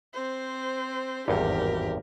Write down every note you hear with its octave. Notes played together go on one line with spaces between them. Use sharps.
C4 C5
G#1 E2 G2 G4 A#4